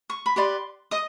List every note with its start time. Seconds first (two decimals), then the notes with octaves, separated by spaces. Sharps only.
0.10 C#6
0.26 B5
0.36 G4 B4 D5 C6
0.91 D#5 D#6